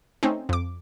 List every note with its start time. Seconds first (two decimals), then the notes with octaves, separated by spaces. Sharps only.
0.23 A3 C4 C#4 D#4
0.49 F2 D6